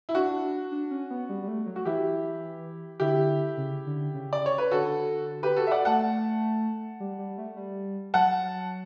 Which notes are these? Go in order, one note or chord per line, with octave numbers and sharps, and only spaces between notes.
E4
D4 F#4
D4
C#4
B3
G3
G3
A3
F#3
F#4
E3 E4 G4
D3 E4 G4
C#3
D3
C#3
D5
C#5
B4
D3 F#4 A4
G4 B4
F#4 A4
E5
D5 F#5
A3 F#5 A5
G3
G3
A3
G3
F#3 F#5 A5